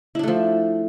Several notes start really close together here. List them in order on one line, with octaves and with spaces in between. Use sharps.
E4 D4 A3 F3